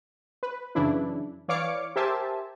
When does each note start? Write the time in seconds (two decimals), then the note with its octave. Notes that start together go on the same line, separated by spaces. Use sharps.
0.43 B4
0.75 F#2 C#3 E3 D4 E4
1.48 E3 C#5 D5 F5 D6 C#7
1.96 G4 A#4 C5 E5 G#5 A5